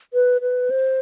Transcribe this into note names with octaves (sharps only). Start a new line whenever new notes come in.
B4
B4
C5